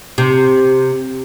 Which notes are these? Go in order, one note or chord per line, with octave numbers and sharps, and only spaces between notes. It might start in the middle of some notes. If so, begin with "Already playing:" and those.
C3